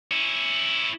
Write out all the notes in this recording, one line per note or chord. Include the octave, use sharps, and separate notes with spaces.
C#4 E4